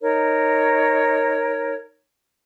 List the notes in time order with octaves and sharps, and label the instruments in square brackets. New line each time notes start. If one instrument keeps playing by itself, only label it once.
[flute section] D#4 A#4 C#5